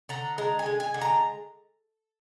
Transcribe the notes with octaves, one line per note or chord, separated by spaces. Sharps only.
D3 A#5
G#3 A#5
G#5
G#3
G#5
D3
A#5